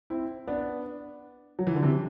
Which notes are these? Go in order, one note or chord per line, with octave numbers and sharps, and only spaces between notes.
C4 E4
B3 D4
F#3
E3
D3
C3 E3